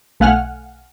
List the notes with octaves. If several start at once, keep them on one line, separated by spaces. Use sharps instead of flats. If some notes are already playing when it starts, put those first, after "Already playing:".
B1 A3 F5 F#5 G#5 F6